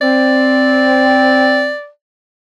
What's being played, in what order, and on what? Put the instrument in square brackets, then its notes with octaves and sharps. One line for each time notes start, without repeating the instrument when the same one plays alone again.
[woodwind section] C4 [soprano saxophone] D5